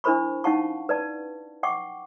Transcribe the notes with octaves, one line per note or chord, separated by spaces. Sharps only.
D4 E4 A#4 C5 B5 C#6
C#4 D#4 F5 F#5 A5 C#6
B4 D5 A5
F#5 G5 C#6 D6